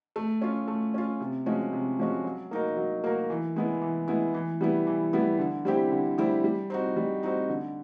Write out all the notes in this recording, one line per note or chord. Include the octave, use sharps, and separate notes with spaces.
A3
C#4 F4
A3
C#4 F4
C3
F3 G#3 C#4 F#4
C3
F3 G#3 C#4 F#4
F#3
A#3 D#4 F#4 A#4
F#3
A#3 D#4 F#4 A#4
E3
G#3 B3 E4
E3
G#3 B3 E4
E3
G3 B3 E4
E3
G3 B3 E4
D3
G3 C4 E4 G4
D3
G3 C4 E4 G4
G3
C4 D#4 F#4
G3
C4 D#4 F#4
D3